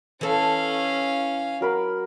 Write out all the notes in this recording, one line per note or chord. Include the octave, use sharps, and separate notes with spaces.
E3 C#4 A4 F5
F#3 A#4 B5